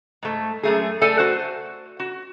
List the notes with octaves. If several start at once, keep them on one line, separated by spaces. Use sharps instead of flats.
G#2 A3
F#2 A3 G#4
A3 A4 D5 G#5
F#4 C5
F#4